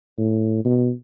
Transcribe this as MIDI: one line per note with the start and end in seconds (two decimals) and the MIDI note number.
0.18 0.62 45
0.64 0.91 47